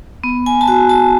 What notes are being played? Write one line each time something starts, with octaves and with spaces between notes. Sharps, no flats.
B3
G#5
A5
F#4 G#5
A5